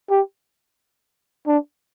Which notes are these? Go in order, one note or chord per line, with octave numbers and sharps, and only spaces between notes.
G4
D4